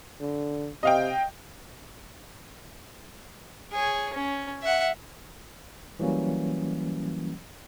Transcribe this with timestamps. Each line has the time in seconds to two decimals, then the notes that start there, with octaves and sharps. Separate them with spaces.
0.20 D3
0.83 C3 D#5 F5 G5
3.72 G#4 C#5
4.14 C#4
4.62 E5 F#5
5.99 E3 F#3 G3 A#3 C#4